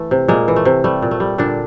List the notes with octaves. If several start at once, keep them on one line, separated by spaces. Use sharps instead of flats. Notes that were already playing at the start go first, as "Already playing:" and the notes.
Already playing: E3 A3
C3
A#2 G#3 A#3
E3
A3
C3
G3 A3
A#2
A3
G3
A#2 D3 D4